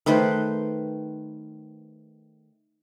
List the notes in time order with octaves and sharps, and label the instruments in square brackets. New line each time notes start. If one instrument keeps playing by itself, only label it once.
[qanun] D#3 A3 B4 C5